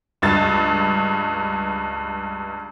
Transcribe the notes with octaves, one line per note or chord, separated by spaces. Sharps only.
C#2 G2 A6